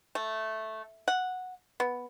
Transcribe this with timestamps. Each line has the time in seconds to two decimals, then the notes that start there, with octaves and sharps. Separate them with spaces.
0.15 A3
1.08 F#5
1.80 B3